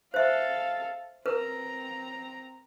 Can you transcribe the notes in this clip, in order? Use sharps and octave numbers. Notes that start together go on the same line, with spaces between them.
A4 C5 E5 F5
C4 A#4 B4 A#5